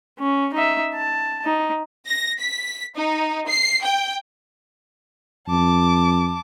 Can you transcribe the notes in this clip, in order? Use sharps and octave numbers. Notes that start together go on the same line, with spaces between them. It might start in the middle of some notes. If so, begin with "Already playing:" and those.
C#4
D#4 E5
A5
D#4
A#6
B6
D#4
C7
G5
F2 A5 D6